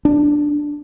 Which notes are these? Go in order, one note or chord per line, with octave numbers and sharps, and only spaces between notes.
D4